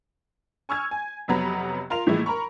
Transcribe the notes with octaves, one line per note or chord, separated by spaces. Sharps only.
G#5 C#6 E6 F6 G#6
G#5
F2 C3 F#3 B3 A#5 B5
F4 A#4 C6 F7
A2 E3 F3 G#3 A#3 E4
A#4 A#5 B5 C#6